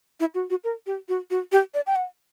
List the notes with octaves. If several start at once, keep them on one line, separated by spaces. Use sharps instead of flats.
E4
F#4
F#4
A#4
G4
F#4
F#4
G4
D5
G5
F#5